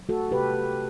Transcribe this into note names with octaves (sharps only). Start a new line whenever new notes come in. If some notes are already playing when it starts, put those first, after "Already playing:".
Already playing: F#3
A3 F#4 A4
C3 G4 B4
A3